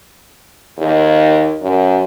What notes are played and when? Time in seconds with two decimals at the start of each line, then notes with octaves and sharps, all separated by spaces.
0.78 D#2
1.62 F#2